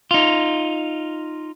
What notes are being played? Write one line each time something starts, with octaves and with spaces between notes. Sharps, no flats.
D#4 F4